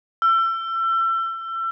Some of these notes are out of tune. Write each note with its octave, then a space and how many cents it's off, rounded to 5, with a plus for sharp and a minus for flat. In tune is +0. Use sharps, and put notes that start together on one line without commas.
E6 +35